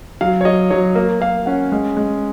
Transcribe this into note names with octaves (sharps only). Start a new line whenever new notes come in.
F#3 F5
C#5
F#3 D#5
F#3 C#5
A#3
A#3 F5
C#4 F#5
G#3
G#3